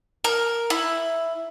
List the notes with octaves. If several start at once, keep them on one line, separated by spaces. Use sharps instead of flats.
A#4
E4